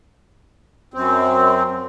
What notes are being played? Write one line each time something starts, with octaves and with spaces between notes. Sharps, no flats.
F#2 C4